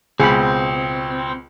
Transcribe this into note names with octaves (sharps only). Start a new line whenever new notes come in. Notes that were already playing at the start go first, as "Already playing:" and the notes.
C#2 B2 C4 G#4 B5